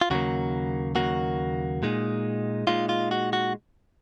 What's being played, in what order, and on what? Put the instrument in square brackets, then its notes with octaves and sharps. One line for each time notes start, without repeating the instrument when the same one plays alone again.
[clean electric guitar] F4
D#2 C#3 F#3 A#3 F#4
D#2 C#3 F#3 A#3 F#4
A#2 G#3 D#4
A#2 G#3 D#4 F4
F4
F#4
F#4